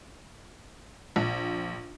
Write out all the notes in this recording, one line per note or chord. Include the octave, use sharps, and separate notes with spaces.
A#1